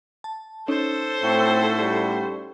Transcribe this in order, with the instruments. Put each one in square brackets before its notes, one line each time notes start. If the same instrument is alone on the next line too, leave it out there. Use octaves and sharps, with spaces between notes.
[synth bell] A5
[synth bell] C#4 D#4 C#5 [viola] A4 C5
[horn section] A2 A3 F#4 [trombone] C4
[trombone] G3